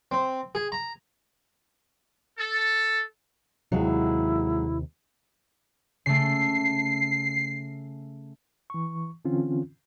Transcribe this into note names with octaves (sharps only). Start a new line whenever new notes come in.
C4
G#4
A#5
A4
D#2 C3 F#3 G#3 E4
C#3 A3 C7
E3 C#6
D3 E3 C4 C#4 F4